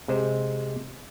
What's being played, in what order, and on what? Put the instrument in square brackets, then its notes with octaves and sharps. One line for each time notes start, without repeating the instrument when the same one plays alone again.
[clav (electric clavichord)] C3 G#3 C5